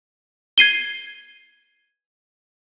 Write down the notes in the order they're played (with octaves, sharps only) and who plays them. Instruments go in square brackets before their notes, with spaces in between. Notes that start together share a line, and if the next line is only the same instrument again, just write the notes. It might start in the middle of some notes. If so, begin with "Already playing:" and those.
[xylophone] G#6 C7 D#7 G7